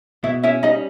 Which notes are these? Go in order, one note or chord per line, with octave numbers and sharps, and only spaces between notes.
B2 E4 E5
C#4 E4 E5
G3 D#4 D#5